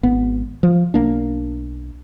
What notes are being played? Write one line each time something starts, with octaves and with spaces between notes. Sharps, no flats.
G#1 B3
F3
B1 A#3 D4